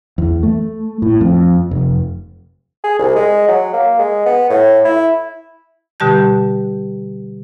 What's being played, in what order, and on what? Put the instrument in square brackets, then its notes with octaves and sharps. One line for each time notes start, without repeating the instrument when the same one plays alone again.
[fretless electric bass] E2
A3
A2
F2
F1
[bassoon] G#4
C2
G#3
F#3
A#3
G#3
B3
A2
E4
[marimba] B2 D3 G3 G4 A5 G6